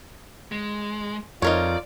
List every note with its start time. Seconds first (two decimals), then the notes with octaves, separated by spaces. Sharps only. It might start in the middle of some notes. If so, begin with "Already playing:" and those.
0.52 G#3
1.42 F2 D#4 F4 A#4 C#5 D5